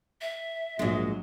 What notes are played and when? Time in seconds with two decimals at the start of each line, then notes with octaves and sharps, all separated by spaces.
0.21 E5
0.79 A#1 G#2 F#3 G#3